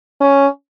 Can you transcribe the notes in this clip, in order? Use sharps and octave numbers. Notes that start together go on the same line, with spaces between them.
C#4